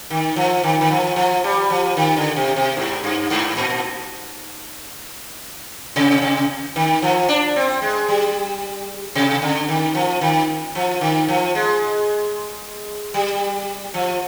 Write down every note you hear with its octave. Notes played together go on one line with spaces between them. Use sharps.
D#3
F3
D#3
D#3
F3
F3
G3
F3
D#3
D3
C3
C3
G#2
G2
G#2
A#2
C3
C3
D#3
F3
D4
C4
G#3
G3
C3
D3
D#3
F3
D#3
F3
D#3
F3
G#3
G3
F3